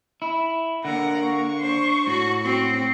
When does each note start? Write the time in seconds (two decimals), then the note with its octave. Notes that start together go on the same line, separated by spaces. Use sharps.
0.22 E4
0.85 D3 A#3 A#4 F#5
1.26 C#6
1.58 D4 C5
2.07 A2 F#4
2.43 C4 F#4